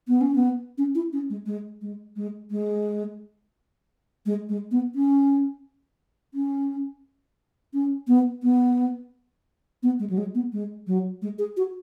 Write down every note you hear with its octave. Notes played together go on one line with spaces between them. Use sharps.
B3
C#4
B3
C#4
E4
C#4
G#3
G#3
G#3
G#3
G#3
G#3
G#3
B3
C#4
C#4
C#4
B3
B3
B3
G#3
F#3
G#3
B3
G#3
F#3
G#3
G#4
F#4